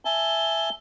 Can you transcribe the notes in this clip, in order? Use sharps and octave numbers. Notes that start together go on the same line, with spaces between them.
E5 G#5 A5 G7